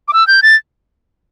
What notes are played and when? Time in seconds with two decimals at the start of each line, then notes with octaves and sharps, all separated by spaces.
0.08 D6
0.13 E6
0.27 G6
0.42 A6